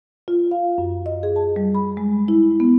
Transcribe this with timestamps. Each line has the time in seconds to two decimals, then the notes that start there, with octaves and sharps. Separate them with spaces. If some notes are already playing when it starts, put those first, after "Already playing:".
0.28 F4
0.51 F5
0.78 F#2
1.06 D#5
1.23 G#4
1.36 A5
1.56 G3
1.75 B5
1.97 G#3
2.28 E4
2.60 B3